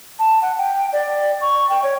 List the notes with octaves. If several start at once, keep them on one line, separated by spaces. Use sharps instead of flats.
A5
F#5
G5
D5
C#6
G5
C#5